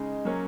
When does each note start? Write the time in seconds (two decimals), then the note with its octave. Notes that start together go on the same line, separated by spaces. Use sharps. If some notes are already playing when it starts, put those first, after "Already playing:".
Already playing: C#3 G#3 D#4
0.25 F#3 A#3 C#4